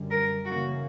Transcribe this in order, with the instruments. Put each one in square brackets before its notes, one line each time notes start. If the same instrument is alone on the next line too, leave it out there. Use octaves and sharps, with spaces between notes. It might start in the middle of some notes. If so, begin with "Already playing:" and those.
Already playing: [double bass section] F#2 D3 G3
[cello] A#4
[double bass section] C#3 E3 A#3 C#4 [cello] F#4